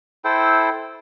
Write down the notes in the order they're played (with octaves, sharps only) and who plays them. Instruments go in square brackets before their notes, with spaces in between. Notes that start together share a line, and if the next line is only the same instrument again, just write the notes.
[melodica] E4 A4 C5 G5